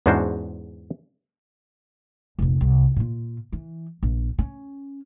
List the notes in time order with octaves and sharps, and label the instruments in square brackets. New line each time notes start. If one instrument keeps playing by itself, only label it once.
[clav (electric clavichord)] E2 G#2 C#4 D4 F#4 C5
[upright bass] F1 A#1
C2
A#2 F4
E3
A#1
C#4